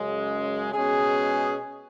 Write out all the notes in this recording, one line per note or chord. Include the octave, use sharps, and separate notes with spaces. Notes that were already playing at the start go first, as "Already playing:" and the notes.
Already playing: F#2 C#3 G#3
B2 G#3 C#4 G#4